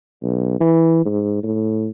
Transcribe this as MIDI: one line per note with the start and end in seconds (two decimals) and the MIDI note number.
0.23 0.60 35
0.60 1.05 52
1.06 1.42 44
1.43 1.89 45